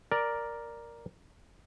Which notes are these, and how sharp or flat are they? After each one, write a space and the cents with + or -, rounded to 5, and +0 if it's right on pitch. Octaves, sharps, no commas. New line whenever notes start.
A#4 +5 D5 +0